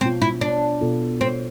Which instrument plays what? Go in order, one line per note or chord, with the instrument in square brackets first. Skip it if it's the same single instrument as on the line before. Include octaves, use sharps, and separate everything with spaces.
[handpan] B2 B3 F4 [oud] C4
[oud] E4
D4
[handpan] B2 B3 F4 A4
[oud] C4